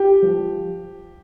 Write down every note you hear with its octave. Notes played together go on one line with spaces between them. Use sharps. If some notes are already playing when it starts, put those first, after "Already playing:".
Already playing: G4
F3